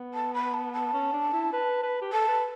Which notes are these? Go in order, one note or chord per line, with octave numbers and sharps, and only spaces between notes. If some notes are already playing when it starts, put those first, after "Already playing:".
Already playing: B3
A5
B5
A5
A5
C#4
D4
E4
B4
B4
G4
A4 A5
B4